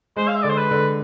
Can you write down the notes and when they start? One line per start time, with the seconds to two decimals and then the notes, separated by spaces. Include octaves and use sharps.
0.16 G#3 C5
0.28 F5
0.35 E5
0.43 D3 D5
0.50 C5
0.58 B4
0.71 D3